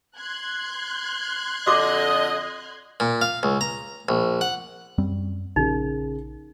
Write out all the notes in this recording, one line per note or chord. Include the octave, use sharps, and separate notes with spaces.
C6 F#6 G#6
F2 D3 F#4 A4 D#5 D6
A#2
F5
C#2
A#5
A#1
F#5
F#2 G3 C4
A#1 C#3 D#4 G#4 A#4